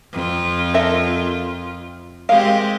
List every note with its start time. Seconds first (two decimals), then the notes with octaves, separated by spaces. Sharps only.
0.14 F2 F4
0.74 A4 A#4 E5
2.29 G#3 C4 G4 A#4 F5